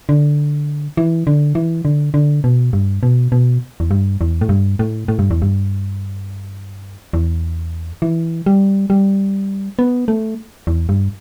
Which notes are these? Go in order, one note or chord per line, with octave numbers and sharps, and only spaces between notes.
D3
E3
D3
E3
D3
D3
B2
G2
B2
B2
E2
G2
E2
A2
G2
A2
A2
G2
E2
G2
E2
E3
G3
G3
B3
A3
E2
G2